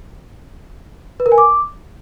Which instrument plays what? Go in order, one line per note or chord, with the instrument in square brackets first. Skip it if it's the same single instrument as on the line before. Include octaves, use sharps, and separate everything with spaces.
[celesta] B4
A#4
G#5
D6